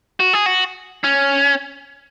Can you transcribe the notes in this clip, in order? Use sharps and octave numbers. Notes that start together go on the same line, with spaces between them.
F#4
G#4
F#4
C#4